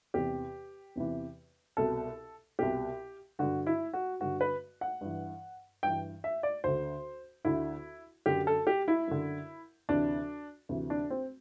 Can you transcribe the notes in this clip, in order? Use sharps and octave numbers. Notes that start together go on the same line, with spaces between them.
E2 C3 E3 G4
E2 C3 E3
C2 B2 A4
C2 B2 G4
G2 D3 F#4
E4
F#4
G2 D3 F#4
B4
F#5
G2 E3
G2 E3 G5
E5
D5
D2 D3 C5
D2 D3 E4
F#2 D3 G4
A4
G4
E4
F#2 D3
D2 C3 E3 D4
D2 C3 E3
D4
C4